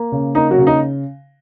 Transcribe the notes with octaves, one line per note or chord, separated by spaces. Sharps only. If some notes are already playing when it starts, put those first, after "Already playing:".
Already playing: A#3
C#3
A#3 D#4
F#3 F#4
C#3
D#4